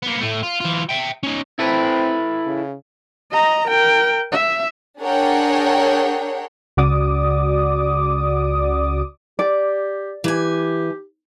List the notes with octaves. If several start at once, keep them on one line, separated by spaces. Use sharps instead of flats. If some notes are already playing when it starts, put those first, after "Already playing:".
A#3 B3
A2 A3
F4
E3 F4
E5 G5
C#4 D#4
C4 E4 A4 B4
C#3
D#5 A#5
A#4 G5
E5
D4 G#4 A#4 C#5 F#5 G5
C#2 C#3 F#4 D5 D6 D#6
G4 D5
E3 G4 G#5